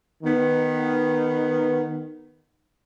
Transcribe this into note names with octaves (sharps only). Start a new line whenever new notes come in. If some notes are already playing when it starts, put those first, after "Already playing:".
D#3 B3